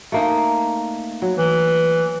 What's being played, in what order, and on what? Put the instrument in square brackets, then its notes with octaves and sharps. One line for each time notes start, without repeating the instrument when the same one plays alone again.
[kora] A3 A#3 D#4
F#3
[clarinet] E3